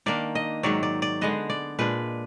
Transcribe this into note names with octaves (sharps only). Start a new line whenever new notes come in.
D#3 A#3 D4 D5
D#5
G#2 D#3 F#3 D5
D5
D5
D3 G#3 B3 D#5
D5
A#2 G#3 D4 B4